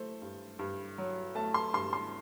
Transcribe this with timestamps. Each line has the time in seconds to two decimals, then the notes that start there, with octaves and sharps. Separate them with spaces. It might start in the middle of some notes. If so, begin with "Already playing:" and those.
Already playing: A3 A4 C5
0.22 G2
0.59 G2
0.98 F#3
1.35 A3 A5
1.54 C6
1.73 G2 C6
1.93 C6